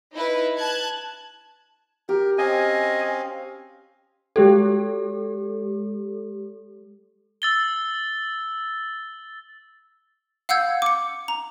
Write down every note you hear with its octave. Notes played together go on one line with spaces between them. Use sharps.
D#4 E4 B4
A5 F#6 G#6
G4 A#4
C4 C#4 D#5 F5 G#5
G#3 G4 A4
E6 A6 G7
F5 F#5 E6 G6 G#6
D6 C#7
A#5